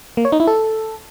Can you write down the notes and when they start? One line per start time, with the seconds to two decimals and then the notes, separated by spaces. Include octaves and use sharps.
0.17 A#3
0.25 C#5
0.32 D#4
0.40 E4
0.47 A4